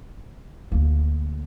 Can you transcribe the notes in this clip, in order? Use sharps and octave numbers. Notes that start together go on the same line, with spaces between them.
D2 A#3